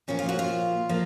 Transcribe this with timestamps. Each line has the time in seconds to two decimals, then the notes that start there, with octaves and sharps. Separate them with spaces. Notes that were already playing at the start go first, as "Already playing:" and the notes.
0.08 A#2 F3 A#3 C#4
0.19 F4
0.29 F#4
0.39 F4
0.89 F3 A#3